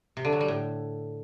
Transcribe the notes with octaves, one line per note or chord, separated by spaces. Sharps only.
C3
D3
F#3
G3
A2